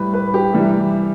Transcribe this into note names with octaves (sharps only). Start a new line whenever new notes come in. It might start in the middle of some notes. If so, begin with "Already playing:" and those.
Already playing: A2 G3 B4
B4
G4
C3 E3 G3